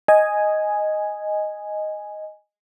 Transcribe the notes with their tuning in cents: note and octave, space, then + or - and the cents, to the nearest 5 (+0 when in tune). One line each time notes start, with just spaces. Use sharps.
D#5 +0 G#5 +0